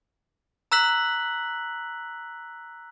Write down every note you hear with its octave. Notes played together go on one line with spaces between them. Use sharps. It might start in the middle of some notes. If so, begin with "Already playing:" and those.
A#5 E6 F#6 B6 F#7